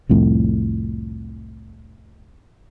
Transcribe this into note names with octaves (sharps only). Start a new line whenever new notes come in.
C2 F2 A2